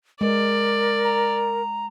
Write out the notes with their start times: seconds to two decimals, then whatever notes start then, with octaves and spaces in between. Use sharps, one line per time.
0.21 G#3 A#4 D5
1.05 A#5